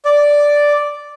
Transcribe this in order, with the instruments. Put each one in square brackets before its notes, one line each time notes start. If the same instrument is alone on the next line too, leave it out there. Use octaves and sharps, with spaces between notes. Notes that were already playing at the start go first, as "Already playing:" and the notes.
[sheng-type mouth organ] D5